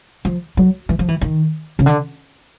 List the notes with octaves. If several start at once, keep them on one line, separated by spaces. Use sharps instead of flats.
F3
F#3
E3
F3
E3
D#3
C#3
D3